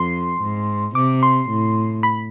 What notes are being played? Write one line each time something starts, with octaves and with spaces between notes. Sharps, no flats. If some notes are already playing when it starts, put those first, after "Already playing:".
Already playing: F2 C6
G#2
C3 D6
C6
A2
B5